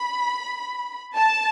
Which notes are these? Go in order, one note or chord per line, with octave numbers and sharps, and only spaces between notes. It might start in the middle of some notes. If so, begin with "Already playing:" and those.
Already playing: B5
A5